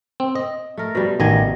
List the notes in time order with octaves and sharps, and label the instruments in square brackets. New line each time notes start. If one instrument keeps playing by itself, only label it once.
[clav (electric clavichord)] C4
D#5
[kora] A3 A#4
B2 G3
[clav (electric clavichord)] A1 D#3 G#5 [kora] D#5